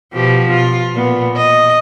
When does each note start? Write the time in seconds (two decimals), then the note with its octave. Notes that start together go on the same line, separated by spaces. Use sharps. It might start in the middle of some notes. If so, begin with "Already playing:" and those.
0.13 B2 F3 G4
0.51 F4
0.94 A#2 B3
1.36 D#5